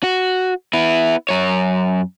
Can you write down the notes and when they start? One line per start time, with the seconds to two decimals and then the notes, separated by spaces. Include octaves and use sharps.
0.03 F#4
0.73 B3 E4
1.29 F#2 C#5